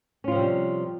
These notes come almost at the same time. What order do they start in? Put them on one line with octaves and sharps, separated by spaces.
C#4 F4 F3 C3 G3